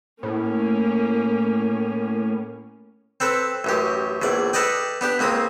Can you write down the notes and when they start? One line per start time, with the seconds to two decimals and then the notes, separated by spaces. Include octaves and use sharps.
0.23 A2 A#3 C#4
3.20 C4 A4 B4
3.64 A1 F#2 G4
4.22 A#1 E2 D5
4.53 A4 B4 D5 D#5 G5
5.01 B3 D4 G4
5.19 C#2 A#3 C4 D#6